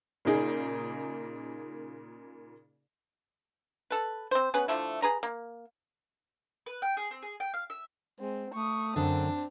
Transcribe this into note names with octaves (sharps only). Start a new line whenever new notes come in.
A#2 C#3 A#3 D#4 G#4
A4 B4
C4 C5
B3 C#4 G#4 B4
D3 F3 A3 E4
G#4 B4 A#5
A#3
B4
G5
G#4
C4
G#4
G5
F5
E5
G#3 C4
A3 C#6 D#6
F#2 D3 C4 D4